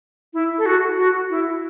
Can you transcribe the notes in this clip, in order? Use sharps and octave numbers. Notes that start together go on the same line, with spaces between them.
E4
A4
F#4
F#4
E4